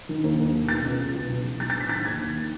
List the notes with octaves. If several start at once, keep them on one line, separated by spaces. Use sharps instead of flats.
D#3
D#2
D#2
D#3
B2 A6
C#2
C#2
B2
B1
E3
B1 A6
A2 A6
B6
D#3 A6
D#2 G#6
D#2
D#3